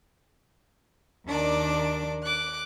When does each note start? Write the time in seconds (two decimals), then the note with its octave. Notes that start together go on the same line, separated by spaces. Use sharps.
1.27 D#2 D#3 D4 D5 D6
2.22 D6 F#6